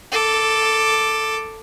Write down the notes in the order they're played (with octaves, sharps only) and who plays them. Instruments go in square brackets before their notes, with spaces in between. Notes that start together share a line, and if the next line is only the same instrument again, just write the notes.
[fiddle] A4 D6